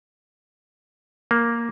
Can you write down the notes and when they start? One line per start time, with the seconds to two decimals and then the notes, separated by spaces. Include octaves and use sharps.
1.31 A#3